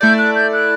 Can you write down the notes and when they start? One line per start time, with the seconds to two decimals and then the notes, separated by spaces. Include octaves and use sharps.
0.01 A3 E4 A4 D5 G6
0.18 F#6
0.36 G6
0.53 F#6